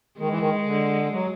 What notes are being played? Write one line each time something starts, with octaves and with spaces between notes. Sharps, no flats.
D#3 G#3
E3
D#3
D3
F#3